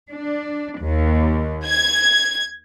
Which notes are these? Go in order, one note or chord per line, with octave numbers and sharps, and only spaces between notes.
D4
D#2
G#6